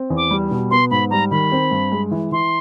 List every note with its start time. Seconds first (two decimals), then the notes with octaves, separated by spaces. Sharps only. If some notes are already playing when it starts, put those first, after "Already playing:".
Already playing: C4
0.10 E2
0.17 D6
0.31 G3
0.51 B2
0.71 B3 C6
0.91 G#2 B5
1.10 G3 A#5
1.31 D#3 B5
1.52 C4
1.71 G2
1.92 G#3
2.11 E3
2.32 E3 C6